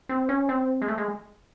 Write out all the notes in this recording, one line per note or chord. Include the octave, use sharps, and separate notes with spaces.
C4
C#4
C4
G#3
A3
G#3